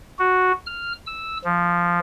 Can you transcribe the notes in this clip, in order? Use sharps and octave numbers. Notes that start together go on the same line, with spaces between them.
F#4
F6
E6
F3